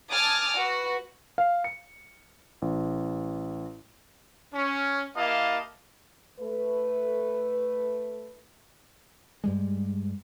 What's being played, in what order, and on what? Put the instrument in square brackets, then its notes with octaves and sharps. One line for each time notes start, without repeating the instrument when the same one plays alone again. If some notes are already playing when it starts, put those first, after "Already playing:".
[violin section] G#5 A5 D6 D#6 F6
F#4 B4
[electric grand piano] F5
C#7
A1
[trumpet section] C#4
A#3 E4 G4 D#5 F5 A5
[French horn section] A3 B4
[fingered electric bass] G2 G3 G#3